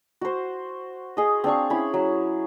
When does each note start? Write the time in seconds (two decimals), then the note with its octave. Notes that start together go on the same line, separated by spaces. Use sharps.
0.21 F#4 C5
1.17 G#4 D#5
1.44 C4 D4 F5 C#6
1.70 C#4 E4 C#5 B5
1.94 F#3